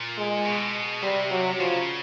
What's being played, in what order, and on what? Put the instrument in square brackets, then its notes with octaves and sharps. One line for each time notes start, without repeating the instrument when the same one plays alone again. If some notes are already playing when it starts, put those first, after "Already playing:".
Already playing: [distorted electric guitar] A#2
[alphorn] G#3
[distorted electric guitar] B2
[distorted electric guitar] C3 [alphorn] G3
[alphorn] F#3
[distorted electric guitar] C#3 [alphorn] F3